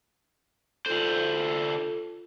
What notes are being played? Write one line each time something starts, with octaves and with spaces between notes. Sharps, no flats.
D3 F4 A4 C5